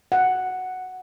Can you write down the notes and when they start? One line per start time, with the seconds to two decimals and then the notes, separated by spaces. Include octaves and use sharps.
0.12 F#5